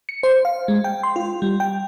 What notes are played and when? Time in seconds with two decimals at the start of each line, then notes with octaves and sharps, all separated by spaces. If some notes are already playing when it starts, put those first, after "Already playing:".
0.09 C#7
0.23 C5
0.45 F5
0.68 G#3
0.84 G5
1.03 C6
1.16 F4
1.42 G3
1.60 G5